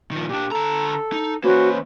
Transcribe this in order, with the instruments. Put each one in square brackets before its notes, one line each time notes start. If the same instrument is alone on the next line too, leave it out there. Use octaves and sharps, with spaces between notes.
[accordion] A#2 [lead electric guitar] D#3 F3
[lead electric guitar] A#2 D4 [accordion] G4
[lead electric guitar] D3 A#5 [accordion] A4
[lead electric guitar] D#4
[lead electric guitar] E3 A#3 [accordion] C#4 B4 C5 [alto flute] F#4